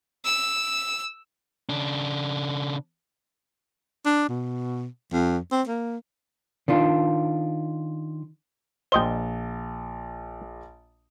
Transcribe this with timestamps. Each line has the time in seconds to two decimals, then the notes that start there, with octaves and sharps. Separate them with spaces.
0.25 E6
1.69 C#3 D4
4.06 D4
4.29 B2
5.13 F2
5.52 C4
5.67 A#3
6.68 D#3 D4 F4
8.92 A#1 C5 D#5 G5 G7